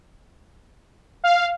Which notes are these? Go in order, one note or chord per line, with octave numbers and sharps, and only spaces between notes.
F5